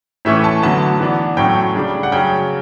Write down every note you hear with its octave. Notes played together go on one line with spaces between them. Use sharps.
A2 E3 A3 C#4 E5
A5
D3 F#3 B3 A5
E3 B3 D4
A2 F#3 A3 C#4 G5
C#3 G3 D4
F#5
C#3 F#3 C#4 G5